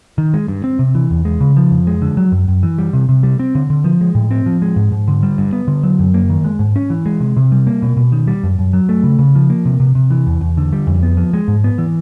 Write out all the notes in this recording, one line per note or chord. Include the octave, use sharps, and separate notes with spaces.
D#3
G#3
G2
C4
C3
E3
E2
G#3
C#3
F3
F2
G#3
D3
F#3
F#2
F#2
E3
G3
C3
C3
G3
C4
D3
D3
F3
G#3
A2
C4
F3
G#3
G#2
G#2
D3
G3
G2
B3
D3
F#3
F#2
A#3
D#3
G#3
G#2
C#4
E3
G#3
C3
C3
G3
A#3
B2
B2
D#3
G3
F#2
F#2
F#3
A3
C#3
C#3
F3
A#3
C3
C3
C3
E3
E2
E2
D3
G3
F2
B3
F3
G#3
G#2
B3
E3